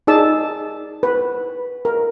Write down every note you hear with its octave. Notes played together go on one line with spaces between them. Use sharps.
D#4 G#4 D5 A5 E6
B4
A#4